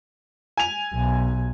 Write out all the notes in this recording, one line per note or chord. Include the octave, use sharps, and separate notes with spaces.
G#5 F7
B1